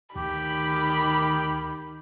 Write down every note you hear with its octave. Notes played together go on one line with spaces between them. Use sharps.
D2 D#3 G4 B5